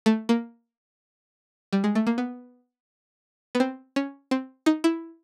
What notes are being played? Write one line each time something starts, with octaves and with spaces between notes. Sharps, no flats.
A3
A#3
G3
G#3
A3
A#3
B3
B3
C4
C#4
C4
D#4
E4